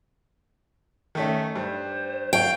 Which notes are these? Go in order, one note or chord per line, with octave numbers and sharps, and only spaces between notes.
D#3 A3 C#4 E5
G2 C5
C#5 F5 G5